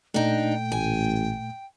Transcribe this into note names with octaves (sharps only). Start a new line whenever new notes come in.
A#2 A3 D4 D#4 G5
A1 G#5